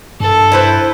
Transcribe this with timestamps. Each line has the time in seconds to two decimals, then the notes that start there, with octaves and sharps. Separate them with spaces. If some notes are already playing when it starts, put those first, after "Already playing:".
0.20 G2 A4
0.52 E4 B4 C5